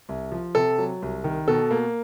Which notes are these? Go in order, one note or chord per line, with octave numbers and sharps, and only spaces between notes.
C2
F3
C3 A4
F#3
C2
D#3
B2 A4
A#3